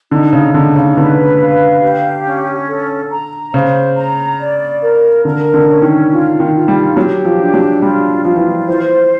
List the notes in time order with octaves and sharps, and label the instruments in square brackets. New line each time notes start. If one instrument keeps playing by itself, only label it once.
[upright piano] D3 [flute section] D#4
[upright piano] C#3
[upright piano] D3 [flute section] D#4
[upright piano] C#3
[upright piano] D3 [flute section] B4
[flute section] F5
G4
C#4
A4
A#5
[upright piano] C#3 [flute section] C5
[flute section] A#5
D5
A#4
[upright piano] D3 [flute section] A#4
[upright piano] D3
[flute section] C#4
[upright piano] D#3
[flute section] F4
[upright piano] D#3
[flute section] F4
[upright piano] G3
[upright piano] F#3 [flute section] G4
[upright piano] F3
[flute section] D4
[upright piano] F#3
[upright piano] G3 [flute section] F4
[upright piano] F3 [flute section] F4
[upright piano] E3
F3
[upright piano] E3 [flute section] C5